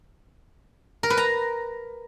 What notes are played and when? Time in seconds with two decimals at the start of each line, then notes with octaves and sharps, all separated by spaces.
1.03 A#4
1.10 B4
1.17 A#5